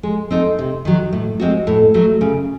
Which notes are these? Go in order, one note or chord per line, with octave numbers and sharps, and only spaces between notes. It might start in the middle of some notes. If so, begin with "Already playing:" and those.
G#3
C4 D#4 A4
C3
D#3 F#3
A2
G#3 C4 F#4
A2
F#3 A3
C#3